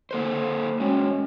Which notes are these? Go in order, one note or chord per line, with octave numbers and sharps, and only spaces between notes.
A#3 A4 C5
G#3 C#4 F#4